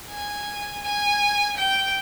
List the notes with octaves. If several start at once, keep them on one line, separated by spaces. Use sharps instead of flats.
G#5
G#5
G5